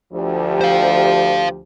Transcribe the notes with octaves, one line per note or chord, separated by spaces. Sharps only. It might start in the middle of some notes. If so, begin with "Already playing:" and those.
D2 F3 G4
C5 F5